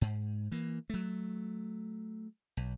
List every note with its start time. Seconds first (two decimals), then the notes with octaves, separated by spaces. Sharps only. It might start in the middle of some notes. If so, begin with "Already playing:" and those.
0.01 G#2
0.52 E3 A#3
0.90 F#3 A3
2.57 B1